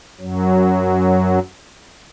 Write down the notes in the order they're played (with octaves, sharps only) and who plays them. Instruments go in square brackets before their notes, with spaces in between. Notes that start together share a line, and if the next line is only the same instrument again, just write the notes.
[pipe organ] F#2 F#3